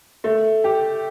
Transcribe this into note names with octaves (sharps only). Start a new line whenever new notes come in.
A3
G4